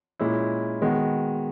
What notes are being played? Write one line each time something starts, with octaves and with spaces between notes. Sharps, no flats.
A#2 G#3 C#4 E4
D#3 G#3 B3 F#4